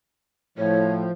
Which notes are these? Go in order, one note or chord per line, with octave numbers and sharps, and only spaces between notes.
A2 F3 C#5